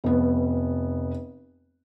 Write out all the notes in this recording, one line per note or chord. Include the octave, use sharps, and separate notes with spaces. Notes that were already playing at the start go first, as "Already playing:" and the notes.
F1 B3